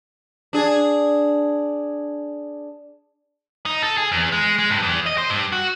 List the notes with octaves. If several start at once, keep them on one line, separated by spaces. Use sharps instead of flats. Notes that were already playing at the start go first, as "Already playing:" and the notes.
D4 G#4
D#4
A4
G#4
E2
G#3
G#3
G2
E2
D#5
C5
G2
F#4